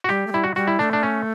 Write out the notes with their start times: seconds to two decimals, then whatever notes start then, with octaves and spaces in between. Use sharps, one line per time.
0.04 F#4
0.09 G3 G4
0.27 A3
0.32 G3 E4
0.44 F#4
0.55 G3 F#4
0.67 E4
0.79 A3 D4
0.93 D4
1.03 C#4